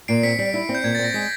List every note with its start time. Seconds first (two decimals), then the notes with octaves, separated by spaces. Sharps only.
0.08 A#2 C7 D7
0.23 C4 B6 C#7
0.39 G3 C7
0.54 E4
0.69 C4
0.75 G6
0.84 A#2 G#6
0.95 C4 A6
1.04 A#6
1.14 G#3 B6